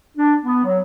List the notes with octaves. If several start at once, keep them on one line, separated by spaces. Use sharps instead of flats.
D4
B3
F#3